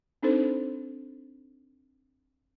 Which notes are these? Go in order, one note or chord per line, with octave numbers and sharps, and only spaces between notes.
C4 D4 D#4 A4 C5